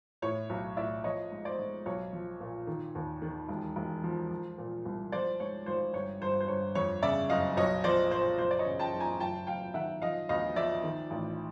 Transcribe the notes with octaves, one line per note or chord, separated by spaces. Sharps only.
A2 C#5
B1
A2 D5 E5
F3 C#5 D#5
G#2
C5 D5
G#2
B1 C#5
F3
A#2
D#3
D#2
D#3
E1
E1
F3
F3
A#2
C2
F3 C5 D5
G#2 C#5
G#1 C5
G1 C#5
G1 C5
C5
G1 C#5
F2 C#5
C#3 D5 E5
F#1 D#5 F5
B1 C#5 D#5
F3 C5 D5
A#2 C5
F#1 C5
D5
C#5 D#5
C#3
G5 A5
F#1
G#5 A#5
F#1 G5 A5
F#1 F5 G5
D#3 E5 F#5
F3 D#5 F5
D2 D#5 F5
F3 D5 E5
D#3
A1